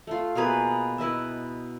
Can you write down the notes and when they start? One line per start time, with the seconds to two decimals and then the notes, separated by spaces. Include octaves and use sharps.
0.07 A3 F4
0.35 B2 A#3 G#4 B4
0.98 E4 B4 D#5 E5